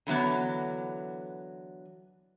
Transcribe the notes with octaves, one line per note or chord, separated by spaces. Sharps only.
D3 E3 F#3 B3